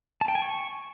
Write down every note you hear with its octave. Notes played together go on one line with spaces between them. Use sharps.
A5
G5
G#5
C#6